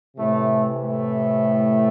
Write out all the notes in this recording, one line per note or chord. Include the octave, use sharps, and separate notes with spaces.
A2 C3 E3 A3
A2 A3